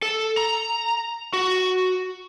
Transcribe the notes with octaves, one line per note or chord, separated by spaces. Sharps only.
A4
A#5
F#4